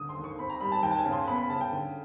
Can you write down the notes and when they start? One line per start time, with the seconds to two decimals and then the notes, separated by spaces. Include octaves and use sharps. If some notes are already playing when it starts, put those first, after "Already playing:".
Already playing: C#2 D3 D#6
0.09 C6
0.16 D#2
0.24 C#6
0.39 C4 B5
0.50 A#5
0.60 G3 B5
0.72 A5
0.83 D#2 G5
0.91 A5
0.98 G#5
1.05 C#3
1.13 C6
1.27 B3 B5
1.38 B5
1.50 C#3 A5
1.61 G5
1.72 D3